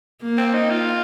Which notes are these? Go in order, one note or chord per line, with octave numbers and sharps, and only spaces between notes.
A#3
C4
D#4
F4